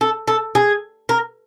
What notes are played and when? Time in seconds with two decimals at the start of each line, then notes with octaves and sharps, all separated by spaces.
0.01 A4
0.28 A4
0.55 G#4
1.09 A#4